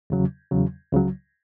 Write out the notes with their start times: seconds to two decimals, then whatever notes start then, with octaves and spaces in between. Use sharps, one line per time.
0.10 E2 C#3 F#3
0.51 E2 C#3 F#3
0.92 C#2 C#3 F#3